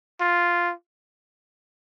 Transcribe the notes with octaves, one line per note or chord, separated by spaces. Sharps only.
F4